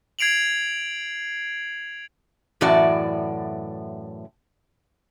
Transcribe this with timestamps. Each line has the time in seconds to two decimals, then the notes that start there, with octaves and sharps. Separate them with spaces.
0.19 G#6 C7 D7 F7 F#7
2.61 F#2 A2 E3 F#4 D5